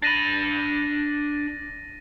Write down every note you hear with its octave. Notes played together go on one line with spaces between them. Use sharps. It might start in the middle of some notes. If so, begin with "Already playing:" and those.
D4 B5 A6 A#6 D#7